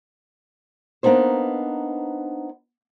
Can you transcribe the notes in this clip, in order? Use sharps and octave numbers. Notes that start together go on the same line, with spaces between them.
A#3 B3 D4 D#4 C5